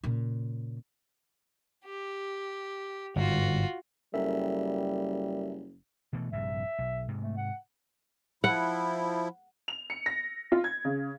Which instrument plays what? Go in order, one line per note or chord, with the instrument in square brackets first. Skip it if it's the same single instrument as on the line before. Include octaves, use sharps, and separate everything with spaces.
[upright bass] A#2 C#3
[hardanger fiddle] G4
[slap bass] G1 G#2 [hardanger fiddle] F4 F#4
[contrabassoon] F#1 [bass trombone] G3 [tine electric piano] A4 A#4 E5
[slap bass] B2 E3 A3
[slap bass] A#1 G2 C3 [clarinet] E5
[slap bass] B1
G#2 C3
[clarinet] A3
F#5
[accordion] F3 E4 [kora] F#5
[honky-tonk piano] F7
C#7
A#6
F4
G#6
C#3